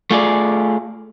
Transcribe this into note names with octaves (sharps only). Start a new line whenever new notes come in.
A3 F4 G#4 D5